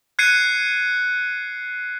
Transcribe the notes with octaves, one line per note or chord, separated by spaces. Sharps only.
F#6 G#6 C7 C#7 D#7